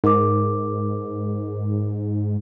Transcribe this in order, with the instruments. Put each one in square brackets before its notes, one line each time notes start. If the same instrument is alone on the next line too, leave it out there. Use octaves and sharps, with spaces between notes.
[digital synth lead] G#2 [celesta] A#4 D6